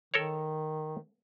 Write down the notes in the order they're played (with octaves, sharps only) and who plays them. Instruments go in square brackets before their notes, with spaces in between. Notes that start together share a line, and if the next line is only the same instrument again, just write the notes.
[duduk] D#3 [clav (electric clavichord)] A4 A#4 C#5